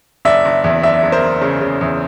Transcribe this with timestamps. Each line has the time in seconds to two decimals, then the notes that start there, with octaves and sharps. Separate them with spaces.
0.25 F#1 D5 E5
0.45 F#1
0.64 E2
0.83 F#1 D5 E5
1.03 F#1
1.12 A#4 C5
1.22 F#1
1.41 C#3
1.61 C#3
1.81 E2